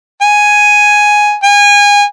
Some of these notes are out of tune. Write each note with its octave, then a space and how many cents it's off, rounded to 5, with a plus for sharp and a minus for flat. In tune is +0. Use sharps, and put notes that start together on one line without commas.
G#5 +5
G#5 -25